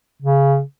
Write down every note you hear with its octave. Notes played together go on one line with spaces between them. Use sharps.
C#3